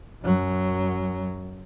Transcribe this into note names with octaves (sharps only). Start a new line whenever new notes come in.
F#2 F#3